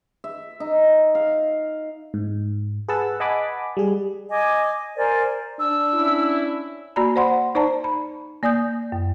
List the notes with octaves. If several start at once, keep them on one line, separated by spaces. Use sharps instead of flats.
E5
D#4
F5
G#2
G#4 B4 F#5 A5 E6
D#5 F#5 G#5 A5 B5 D6
G3 G#4
D#5 G#5 D6
A#4 C5 D5 G#5
D4 E6
C#4 E4
A#3 F#4 D5 A#5 B5
C5 D5 F#5 B5 C6
D#4 C5 D5 A5 A#5
B5
A#3 D5 G#5 D#6 G6
F#2